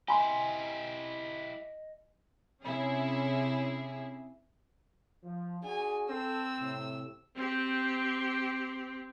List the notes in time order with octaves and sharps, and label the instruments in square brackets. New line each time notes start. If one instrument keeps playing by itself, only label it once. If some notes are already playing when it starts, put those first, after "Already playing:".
[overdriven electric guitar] E4 G4 [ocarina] D#5 [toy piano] G#5 C6
[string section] C3 C#4 E4 G#4
[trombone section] F3
[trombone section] D4 F#4 G#4 [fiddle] G#5
[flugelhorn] C4 [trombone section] A4 [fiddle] E6
[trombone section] A2 C3
[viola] C4 G4